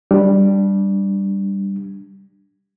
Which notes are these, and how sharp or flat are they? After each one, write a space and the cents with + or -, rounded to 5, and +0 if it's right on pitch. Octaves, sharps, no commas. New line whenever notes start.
G3 +0 D4 +0